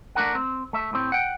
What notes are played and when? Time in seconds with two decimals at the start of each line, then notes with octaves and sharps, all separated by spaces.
0.15 A3 D4 A#4 F#5
0.35 C4
0.73 A3 E5
0.93 A2 C4
1.12 F#5 G5